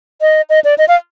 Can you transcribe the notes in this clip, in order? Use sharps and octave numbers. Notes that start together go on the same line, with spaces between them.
D#5
D#5
D5
D#5
F5